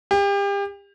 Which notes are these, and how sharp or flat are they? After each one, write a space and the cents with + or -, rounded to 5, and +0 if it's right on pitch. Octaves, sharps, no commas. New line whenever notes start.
G4 +35